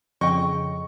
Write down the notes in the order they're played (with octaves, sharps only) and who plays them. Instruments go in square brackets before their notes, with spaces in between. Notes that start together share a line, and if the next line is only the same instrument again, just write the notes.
[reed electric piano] F2 [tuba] C#3 [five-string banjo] D#5 G5 [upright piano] C#6